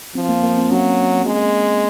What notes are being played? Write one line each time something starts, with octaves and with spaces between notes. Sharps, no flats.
F3 C4
A#3
A#3
C4
F#3 C#4
G#3